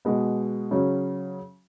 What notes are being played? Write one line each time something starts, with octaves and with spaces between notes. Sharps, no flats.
B2 G#3 B3
C#3 F#3 C#4